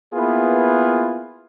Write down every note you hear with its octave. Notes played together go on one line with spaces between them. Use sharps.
A#3 B3 E4 F4 G#4 B4